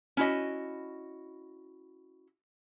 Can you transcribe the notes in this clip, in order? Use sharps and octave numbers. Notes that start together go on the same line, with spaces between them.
C#4 E4 F#4 D#5